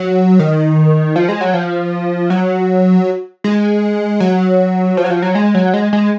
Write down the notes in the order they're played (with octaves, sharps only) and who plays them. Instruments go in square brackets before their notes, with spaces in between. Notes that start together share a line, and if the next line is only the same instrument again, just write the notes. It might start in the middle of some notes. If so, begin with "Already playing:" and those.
Already playing: [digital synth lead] F#3
D#3
F3
G#3
F#3
F3
F#3
G#3
F#3
F3
F#3
F3
F#3
G#3
F#3
G#3
G#3